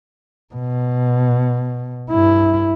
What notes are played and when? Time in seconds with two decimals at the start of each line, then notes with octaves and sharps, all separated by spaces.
0.54 B2
2.10 G2 E4